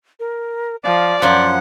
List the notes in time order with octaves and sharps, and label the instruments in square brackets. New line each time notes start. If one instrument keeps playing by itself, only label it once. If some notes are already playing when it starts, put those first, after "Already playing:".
[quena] A#4
[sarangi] F3 [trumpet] D5 [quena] F5
[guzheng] F#2 F3 [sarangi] F#5 [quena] C6